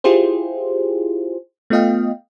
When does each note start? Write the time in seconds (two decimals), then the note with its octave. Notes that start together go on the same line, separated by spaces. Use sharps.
0.04 E4 F4 G4 G#4 C5
1.70 A3 B3 F4 D#5 F5 G5